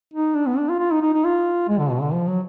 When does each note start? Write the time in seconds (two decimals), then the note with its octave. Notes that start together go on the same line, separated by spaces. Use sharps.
0.14 D#4
0.35 D4
0.47 B3
0.58 D4
0.69 F4
0.79 F4
0.91 D#4
1.02 D#4
1.14 D#4
1.25 F4
1.68 G#3
1.79 D3
1.91 B2
2.02 D3
2.13 F3
2.27 F#3